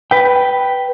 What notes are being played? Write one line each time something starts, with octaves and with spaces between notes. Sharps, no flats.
B4 G5